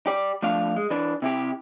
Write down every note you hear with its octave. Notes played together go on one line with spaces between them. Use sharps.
G4 D5
F3 A3 D4 F5
G#3
E3 D4
C3 E4 G4